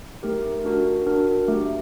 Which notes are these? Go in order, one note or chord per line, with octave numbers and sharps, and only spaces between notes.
A3 D#4 G4 A#4
D4 F#4 A#4
D4 F#4 A#4
A3 D4 G4